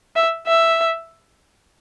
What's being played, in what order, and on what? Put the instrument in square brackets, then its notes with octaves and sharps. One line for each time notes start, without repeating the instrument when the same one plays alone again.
[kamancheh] E5
E5